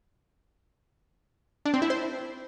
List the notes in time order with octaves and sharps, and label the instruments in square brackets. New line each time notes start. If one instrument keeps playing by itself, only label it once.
[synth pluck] D4
C4
E4
C5